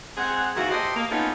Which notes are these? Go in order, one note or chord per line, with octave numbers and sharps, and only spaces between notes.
G#3 C4 G#4 F#5
G#2 D#3 E3 A#3 F#4
G4 A4 C5 D#5
A#3
A3 B3 C#4 D#4 F4 G#4